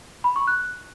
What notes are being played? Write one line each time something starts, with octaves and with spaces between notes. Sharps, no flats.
B5
C#6
F#6